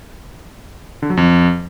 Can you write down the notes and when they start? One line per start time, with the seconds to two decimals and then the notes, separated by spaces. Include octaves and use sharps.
1.02 D3
1.10 F#3
1.17 F2